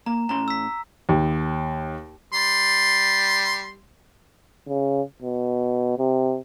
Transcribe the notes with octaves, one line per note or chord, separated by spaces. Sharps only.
A#3 A#5
A2 C#4 A#5 C6
E6 B6
D#2
G3 C6
C#3
B2
C3